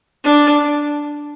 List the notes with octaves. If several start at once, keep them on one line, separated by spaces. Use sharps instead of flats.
D4